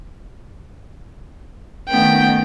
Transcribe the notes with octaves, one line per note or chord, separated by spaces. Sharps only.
D#3 A3 B3 C#4 G5